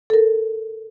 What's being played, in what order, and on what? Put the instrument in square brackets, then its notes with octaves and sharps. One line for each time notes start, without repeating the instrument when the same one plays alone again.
[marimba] A4 A#4